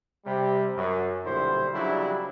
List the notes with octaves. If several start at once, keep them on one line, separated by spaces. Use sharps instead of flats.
C3 G3
F#2
B1 A#2 D3 G3 E4 C5
F2 C#3 F#3 G3 D4 E4